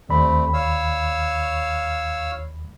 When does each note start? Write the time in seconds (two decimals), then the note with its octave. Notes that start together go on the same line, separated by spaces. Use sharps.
0.09 D#2 A3 C4 D5 B5
0.53 C#5 F5 E6